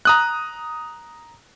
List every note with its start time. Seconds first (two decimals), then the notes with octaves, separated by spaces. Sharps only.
0.05 A#5 D#6 F#6